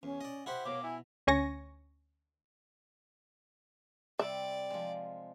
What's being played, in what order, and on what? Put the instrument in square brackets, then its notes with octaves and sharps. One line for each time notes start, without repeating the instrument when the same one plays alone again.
[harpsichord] E2 [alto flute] C#4
[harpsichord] D5 D#5
[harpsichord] E4 G4 C5 [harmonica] F#5
[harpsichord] B2 [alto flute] C#5 [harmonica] F5 D6
[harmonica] E4 [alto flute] G#5
[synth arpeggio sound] D2 C#4 C#5 G#5 C#6 A#6
[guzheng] C3 G3 [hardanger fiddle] D5 [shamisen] E5
[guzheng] F3 G#3